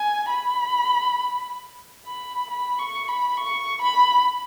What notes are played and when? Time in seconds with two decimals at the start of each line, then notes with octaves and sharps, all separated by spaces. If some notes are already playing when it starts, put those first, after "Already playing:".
Already playing: G#5
0.30 B5
2.06 B5
2.50 B5
2.79 C#6
3.08 B5
3.37 C#6
3.82 B5